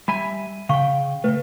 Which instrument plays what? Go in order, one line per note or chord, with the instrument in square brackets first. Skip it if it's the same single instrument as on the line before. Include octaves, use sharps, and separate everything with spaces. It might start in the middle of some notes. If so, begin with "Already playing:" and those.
[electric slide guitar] G3 E5 G#5 [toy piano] B5
[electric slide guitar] C#3 G5 [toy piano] F5 C#6
[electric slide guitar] C#3 A3 [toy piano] B4